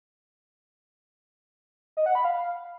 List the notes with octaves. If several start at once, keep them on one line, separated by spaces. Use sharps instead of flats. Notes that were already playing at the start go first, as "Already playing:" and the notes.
D#5
F#5
B5
F5